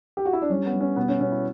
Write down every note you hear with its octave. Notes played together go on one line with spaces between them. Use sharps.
G4
F#4
E4
D4
G3 C#4
B3
G3
C#4
B2 B3
C#4
B2 C#4
E4